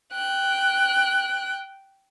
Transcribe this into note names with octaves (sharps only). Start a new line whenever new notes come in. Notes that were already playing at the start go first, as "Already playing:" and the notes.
G5 F#6